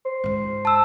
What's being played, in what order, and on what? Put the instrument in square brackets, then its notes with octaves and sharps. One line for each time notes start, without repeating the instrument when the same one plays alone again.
[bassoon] C5
[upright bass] C#2 G#2
[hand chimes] A5 E6